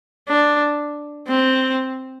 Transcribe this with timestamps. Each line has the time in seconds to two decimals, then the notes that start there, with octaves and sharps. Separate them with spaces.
0.29 D4
1.28 C4